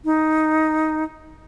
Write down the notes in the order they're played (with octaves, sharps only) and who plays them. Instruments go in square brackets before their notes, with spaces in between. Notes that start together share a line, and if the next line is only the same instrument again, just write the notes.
[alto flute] D#4